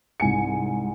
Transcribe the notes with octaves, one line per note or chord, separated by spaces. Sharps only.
C2 G#2 G#5 C#7